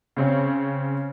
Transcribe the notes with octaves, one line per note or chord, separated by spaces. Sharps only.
C#3 C4 C#4